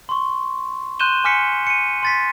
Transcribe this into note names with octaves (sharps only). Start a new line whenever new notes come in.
C6 C#6
C6 F#6 G6 D#7 E7 G7
G#5 D6 F6 B6 C#7
C#7 D#7
C6 A6 B6